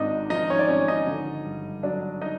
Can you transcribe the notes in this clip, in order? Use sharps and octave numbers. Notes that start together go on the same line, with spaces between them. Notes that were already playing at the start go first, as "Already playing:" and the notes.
Already playing: G#1 G#2 D4 D#4 D#5
F3 D#4 D#5
C#4 C#5
D5
G#1 C#4 C#5
D#4 D#5
D3
G2
F#3 D4 D5
D#4 D#5